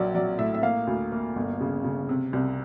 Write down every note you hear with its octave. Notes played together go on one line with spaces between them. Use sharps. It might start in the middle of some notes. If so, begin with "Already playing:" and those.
Already playing: A#1 F#3 A#3 D5
F#3 D5
A2 E5
E5
A#3 F5
D2
A#3
G1
C#3
C#3
C3
C2